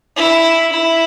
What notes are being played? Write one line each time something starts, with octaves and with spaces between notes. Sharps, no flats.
E4
E4